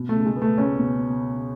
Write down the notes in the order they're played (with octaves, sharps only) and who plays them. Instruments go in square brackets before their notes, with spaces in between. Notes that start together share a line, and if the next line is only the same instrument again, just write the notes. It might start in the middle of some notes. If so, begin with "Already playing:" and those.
Already playing: [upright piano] B2
[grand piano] A3
[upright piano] C#2
[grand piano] G#3
[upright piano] B3
[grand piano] A3
[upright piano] C#2 [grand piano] C#4
[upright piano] B2